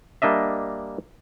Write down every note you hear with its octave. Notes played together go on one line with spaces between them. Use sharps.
G3 A#3 D4 D#5 E5